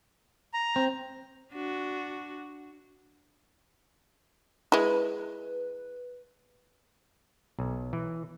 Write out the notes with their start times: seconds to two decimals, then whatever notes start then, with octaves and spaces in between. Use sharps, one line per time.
0.54 A#5
0.76 C4
1.52 D4 F#4
4.72 G#3 E4 B4
7.59 B1
7.93 E3